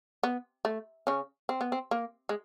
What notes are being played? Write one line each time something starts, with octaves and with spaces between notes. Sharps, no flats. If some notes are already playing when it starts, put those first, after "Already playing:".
B3
A3
C#3 C#4
C4
B3
C4
A#3
G#3